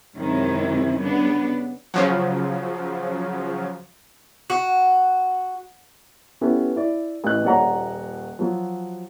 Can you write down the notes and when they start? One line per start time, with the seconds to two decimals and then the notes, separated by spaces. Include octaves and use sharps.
0.17 F#2 C3 D#3 G#3 C#4 E4
1.00 C#3 G3 B3 D4
1.94 C#3 F3 F#3
4.50 F#4
6.41 B3 C#4 E4 G4 A4 B4
6.76 E4 D5
7.24 A1 E3 F#6
7.43 D#1 A#1 C#5 D5 F#5 A#5
8.39 F3 F#3